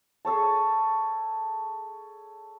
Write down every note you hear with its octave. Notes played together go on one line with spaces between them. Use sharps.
G#4 A4 C#5 A5